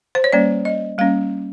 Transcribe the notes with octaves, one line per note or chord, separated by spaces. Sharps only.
C5
C#5
G3 A#3 C#4 D5
D#5
G3 A#3 C#4 F5